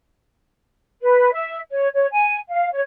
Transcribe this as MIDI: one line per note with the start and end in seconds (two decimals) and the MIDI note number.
1.01 1.31 71
1.32 1.57 76
1.70 1.87 73
1.93 2.06 73
2.11 2.38 80
2.49 2.69 77
2.72 2.80 73